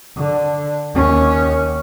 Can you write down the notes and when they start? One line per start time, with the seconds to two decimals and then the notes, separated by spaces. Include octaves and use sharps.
0.17 D3
0.95 D#2 C#4